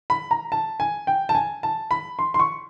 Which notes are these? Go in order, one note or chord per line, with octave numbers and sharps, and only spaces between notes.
B5
A#5
A5
G#5
G5
A5
G#5
A5
B5
C6
C6
C#6